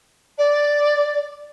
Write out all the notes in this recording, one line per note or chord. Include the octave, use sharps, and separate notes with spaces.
D5